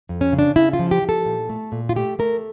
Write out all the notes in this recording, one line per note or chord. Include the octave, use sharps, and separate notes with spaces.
F2
C#4
C#3
D4
C#3 E4
F4
F3
G4
F3
A4
A#2
A3
A#2
F4
A3 G4
A3 A#4